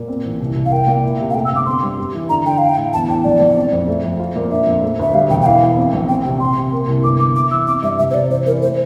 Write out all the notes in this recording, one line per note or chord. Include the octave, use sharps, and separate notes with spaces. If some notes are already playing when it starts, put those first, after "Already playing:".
Already playing: A#2
C4
A1
C2
C2
F5
A#4 G5
A#2
E4
C3
F5
A3 G5
E6
G1 D6
C4 C6
G2
G4
E3
D3 A#5
D3 G5
E4 F5
G5
A2
E2 A5
E2 G5
A#1 D5
A#1
C4
F2
A3
F2
F4
A#2
D4 E5
F2
A3
D2 E5
G3 F5
E1 G5
G5
E3 F5
E3
C4
A#1
C4 G5
C3 G5
C4 C6
C3
A#3
C2
G1 D6
G1 D6
E4 D6
E3 E6
C4 D6
G2 E5
C3 E5
C5
C3 D5
E3 C5
E3 A#4
A3 C5